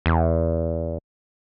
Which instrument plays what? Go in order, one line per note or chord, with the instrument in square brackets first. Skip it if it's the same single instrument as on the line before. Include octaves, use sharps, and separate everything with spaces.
[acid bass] E2